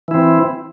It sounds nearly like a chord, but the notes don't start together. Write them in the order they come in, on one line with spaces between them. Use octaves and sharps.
E3 E4 C4